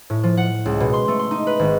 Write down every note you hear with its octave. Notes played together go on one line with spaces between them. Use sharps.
A2
F3
F#5
C#2
B2
C6
A3
C6
D#4
B4
G#1